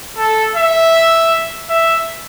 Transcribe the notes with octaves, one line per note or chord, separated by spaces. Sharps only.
A4
E5
E5